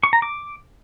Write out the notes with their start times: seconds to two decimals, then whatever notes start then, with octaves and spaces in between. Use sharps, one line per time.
0.03 C#6
0.13 A#5
0.22 D6